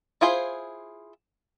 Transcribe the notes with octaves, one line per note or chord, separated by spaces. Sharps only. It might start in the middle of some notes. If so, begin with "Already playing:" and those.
E4 F4 G#4 C5